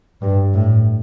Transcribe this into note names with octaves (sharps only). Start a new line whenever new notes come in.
G2
A2